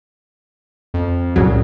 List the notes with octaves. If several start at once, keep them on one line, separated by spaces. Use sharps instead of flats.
F2
C2 A2 C#3 F#3